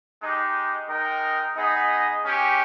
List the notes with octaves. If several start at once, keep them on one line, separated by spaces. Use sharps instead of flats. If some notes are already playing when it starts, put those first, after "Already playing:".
G#3 D#4 G4
G#3 D#4 A#4 D#5 G5
B3 D#4 G#4 D#5
G#3 C#4 G4